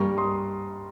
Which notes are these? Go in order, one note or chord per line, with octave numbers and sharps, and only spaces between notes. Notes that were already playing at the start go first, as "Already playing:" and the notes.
Already playing: G2 G3 A#3 A#5 C#6
C6 D#6